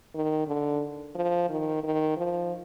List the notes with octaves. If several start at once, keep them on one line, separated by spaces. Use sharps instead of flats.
D#3
D3
F3
D#3
D#3
F3